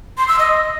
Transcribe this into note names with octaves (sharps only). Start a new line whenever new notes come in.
C6
E6
D#5